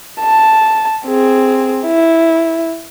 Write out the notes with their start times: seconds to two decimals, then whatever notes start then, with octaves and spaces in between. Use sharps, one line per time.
0.21 A5
1.06 C4 G#4
1.85 E4